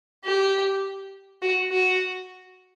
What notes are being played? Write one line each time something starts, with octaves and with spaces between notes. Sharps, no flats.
G4
F#4
F#4